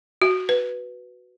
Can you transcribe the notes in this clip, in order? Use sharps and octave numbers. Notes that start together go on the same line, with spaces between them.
F#4
B4